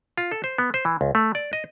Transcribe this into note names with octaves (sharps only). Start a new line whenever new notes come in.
F4
A4
C5
B3
C5
E3
C#2
A3
D5
D#5